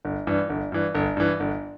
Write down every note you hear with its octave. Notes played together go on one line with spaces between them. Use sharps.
G1
G2 E3
G1
G2 E3
G1
G2 E3
G1